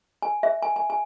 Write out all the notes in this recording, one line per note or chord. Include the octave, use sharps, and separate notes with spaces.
G#5
E5
G#5
G#5
G#5